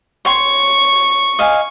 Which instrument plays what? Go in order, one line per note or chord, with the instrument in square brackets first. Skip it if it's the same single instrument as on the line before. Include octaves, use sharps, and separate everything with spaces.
[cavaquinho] C#5 G5 C6 [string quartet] C#6
[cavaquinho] D#5 F5 G#5